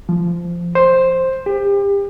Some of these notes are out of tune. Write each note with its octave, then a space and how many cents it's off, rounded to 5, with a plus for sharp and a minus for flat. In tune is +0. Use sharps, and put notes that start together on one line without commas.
F3 -15
C5 +5
G4 +30